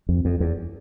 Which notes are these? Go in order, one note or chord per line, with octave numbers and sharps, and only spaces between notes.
F2
F2
E2